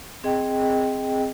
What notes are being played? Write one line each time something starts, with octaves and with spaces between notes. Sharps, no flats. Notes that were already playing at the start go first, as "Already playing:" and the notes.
C4 G#4 D#5 G5